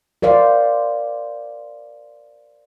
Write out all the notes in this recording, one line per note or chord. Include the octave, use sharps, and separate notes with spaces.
A#4 C5 D5 F5